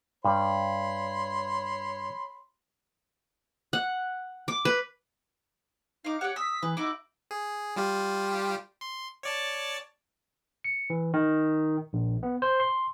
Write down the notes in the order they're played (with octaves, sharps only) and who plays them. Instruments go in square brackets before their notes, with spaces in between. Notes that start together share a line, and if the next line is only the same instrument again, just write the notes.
[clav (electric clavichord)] G2 [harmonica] C#5 B5 C6
[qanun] F#5
D6
B4
[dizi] D#4 [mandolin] F5 D6
[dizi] G4 [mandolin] C#5 D5 [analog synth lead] F#5
[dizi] D#6 [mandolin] E6 [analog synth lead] B6
[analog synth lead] E3 [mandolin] B4
[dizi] D#4 [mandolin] E4 F#4 [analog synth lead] D6
[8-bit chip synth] G#4
G3 F4 G4
C6
C#5 D5 A5
[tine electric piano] C#7
E3
D#3
A#1
B3
C5
C6